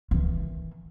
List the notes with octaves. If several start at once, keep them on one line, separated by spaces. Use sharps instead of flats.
D#3 E3